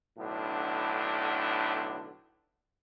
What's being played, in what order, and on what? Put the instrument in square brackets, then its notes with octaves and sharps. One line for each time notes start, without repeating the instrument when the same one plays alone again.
[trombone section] B1 A2 D3 D4